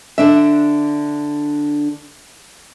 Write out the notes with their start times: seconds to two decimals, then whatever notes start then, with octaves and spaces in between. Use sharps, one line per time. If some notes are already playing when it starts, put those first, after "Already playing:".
0.18 D3 D4 E5